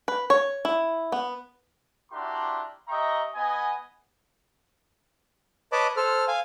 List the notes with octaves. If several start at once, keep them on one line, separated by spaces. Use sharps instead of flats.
B4
C#5
E4
B3
D4 E4 F#4 G4 A#4 C6
G4 D#5 E5 G5 A#5 C#6
B3 D#5 G#5
B4 C#5 D#5 A5 B5 D6
A4 C5 F6
F5 G#5